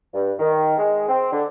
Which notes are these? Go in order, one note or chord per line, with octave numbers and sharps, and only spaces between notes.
G2
D#3
G#3
C4
D3